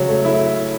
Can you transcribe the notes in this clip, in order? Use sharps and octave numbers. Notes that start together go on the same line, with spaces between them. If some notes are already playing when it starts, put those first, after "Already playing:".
Already playing: C#3 F#3
A3
E4